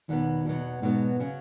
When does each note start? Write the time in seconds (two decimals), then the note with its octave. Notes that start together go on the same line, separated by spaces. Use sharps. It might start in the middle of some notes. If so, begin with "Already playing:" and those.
0.09 E2 B2 D#3 F#3 B3
0.45 E2 B2 F#3 B3
0.82 E2 G#2 B2 F#3 B3
1.20 C#3 F#3 C#4